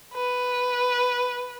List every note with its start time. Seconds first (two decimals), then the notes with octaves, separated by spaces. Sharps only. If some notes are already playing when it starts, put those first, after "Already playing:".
0.14 B4